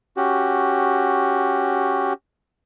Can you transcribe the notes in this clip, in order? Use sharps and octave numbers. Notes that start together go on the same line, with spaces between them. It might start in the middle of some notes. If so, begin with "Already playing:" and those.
C#4 F#4 G4